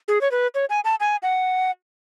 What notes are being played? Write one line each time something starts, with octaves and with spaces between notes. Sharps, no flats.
G#4
C#5
B4
C#5
G#5
A5
G#5
F#5